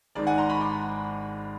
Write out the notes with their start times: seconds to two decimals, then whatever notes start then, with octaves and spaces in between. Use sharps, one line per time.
0.15 G#1 G#2 D#3 D5
0.27 F#5 G#5
0.38 A#5 C6
0.49 B5 C#6
0.60 C6 D6